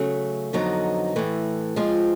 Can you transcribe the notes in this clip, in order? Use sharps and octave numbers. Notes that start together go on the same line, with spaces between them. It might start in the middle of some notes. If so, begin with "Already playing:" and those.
Already playing: C#3 F#3 A3
F2 D3 F#3 B3 D#4
A2 E3 A3
F3 G#3 C4 F4